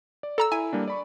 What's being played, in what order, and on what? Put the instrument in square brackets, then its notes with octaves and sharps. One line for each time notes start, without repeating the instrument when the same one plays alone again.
[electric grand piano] D5
[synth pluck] A4 A#5 E6
[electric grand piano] E4 [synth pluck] G#5
[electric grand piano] G3 A#3 D4
D5 B5 C#6